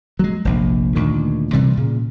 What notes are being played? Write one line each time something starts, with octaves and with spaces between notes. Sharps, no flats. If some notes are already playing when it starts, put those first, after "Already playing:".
F#3 G#3
F1 A#1
D2 A#2 D#3
C3 E3 G3
A#2 C#3